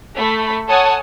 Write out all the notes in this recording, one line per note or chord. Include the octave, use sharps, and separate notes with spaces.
A3 B5
A4 C#5 F#5 G#5 A5 D#6